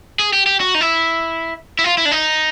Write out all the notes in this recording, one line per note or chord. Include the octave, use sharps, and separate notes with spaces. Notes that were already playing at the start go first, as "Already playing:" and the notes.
G#4
G4
G4
F#4
D#4
E4
E4
F4
E4
D4
D#4